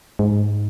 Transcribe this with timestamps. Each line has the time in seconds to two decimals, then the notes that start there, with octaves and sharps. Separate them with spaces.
0.19 G#2